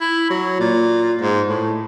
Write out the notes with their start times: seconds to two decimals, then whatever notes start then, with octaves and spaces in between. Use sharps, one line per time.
0.01 E4
0.30 F#3
0.60 A#2
1.21 G#2
1.48 A2